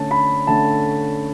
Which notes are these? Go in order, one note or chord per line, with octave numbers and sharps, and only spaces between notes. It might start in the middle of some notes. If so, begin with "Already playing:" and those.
Already playing: D3 A3 C#4 A5
B5
D3 A3 C#4 A5